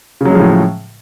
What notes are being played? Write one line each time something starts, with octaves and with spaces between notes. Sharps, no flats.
A2 C#3 F3 F#3 G#3